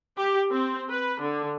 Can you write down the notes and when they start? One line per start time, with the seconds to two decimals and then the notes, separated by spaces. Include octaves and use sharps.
0.17 G4
0.50 C4
0.89 B4
1.20 D3